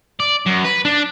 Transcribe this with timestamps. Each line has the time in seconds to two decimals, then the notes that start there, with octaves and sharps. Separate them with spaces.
0.20 D5
0.46 F#2
0.64 B4
0.85 D4